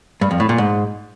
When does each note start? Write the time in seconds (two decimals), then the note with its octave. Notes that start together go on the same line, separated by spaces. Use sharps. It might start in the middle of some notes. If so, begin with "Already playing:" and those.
0.21 G2
0.31 F2
0.40 A2
0.49 A#2
0.58 G#2